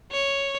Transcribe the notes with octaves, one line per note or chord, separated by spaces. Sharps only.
C#5